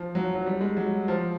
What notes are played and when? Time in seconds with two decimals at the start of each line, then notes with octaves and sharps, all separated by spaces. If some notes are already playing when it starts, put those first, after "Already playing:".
Already playing: F3
0.15 F#3
0.35 F#3
0.46 G3
0.61 G#3
0.77 F#3
1.08 F3